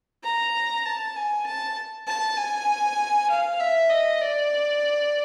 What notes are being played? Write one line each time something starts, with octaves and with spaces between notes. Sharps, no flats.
A#5
A5
G#5
A5
A5
G#5
F5
E5
D#5
D5